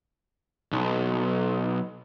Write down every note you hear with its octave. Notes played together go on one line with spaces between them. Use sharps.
B1